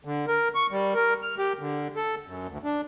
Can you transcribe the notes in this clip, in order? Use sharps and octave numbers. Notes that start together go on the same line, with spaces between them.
D3
A#4
C#6
G3
A#4
F6
G4
D3
A4
F#2
D2
D4